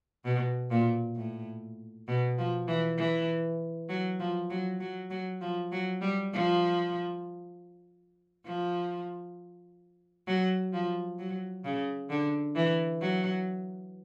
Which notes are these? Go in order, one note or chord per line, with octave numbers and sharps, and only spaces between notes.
B2
A#2
A2
B2
F3
E3
E3
F#3
F3
F#3
F#3
F#3
F3
F#3
G3
F3
F3
F#3
F3
F#3
C#3
D3
E3
F#3